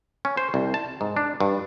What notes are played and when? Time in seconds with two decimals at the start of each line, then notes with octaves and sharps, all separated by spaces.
0.25 C#4
0.37 C5
0.54 C2
0.74 A5
1.01 G#2
1.17 D4
1.40 G2